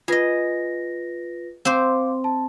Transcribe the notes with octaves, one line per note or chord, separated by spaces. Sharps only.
F4 G#4 B4 D#5 A#6
C4 C5 F5 C6 D6
A5